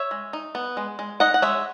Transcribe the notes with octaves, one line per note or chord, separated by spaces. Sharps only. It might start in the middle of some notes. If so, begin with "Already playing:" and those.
Already playing: C#5 E5
G#3
D#4
B3
G#3
G#3
D#4 D#5 F#5
F#5
G#3 C#5 E5